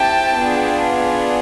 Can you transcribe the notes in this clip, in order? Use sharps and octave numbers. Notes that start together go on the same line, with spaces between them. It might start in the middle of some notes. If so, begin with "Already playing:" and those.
Already playing: C4 E4 G4 G5 A5
B3 D4 F4 G#4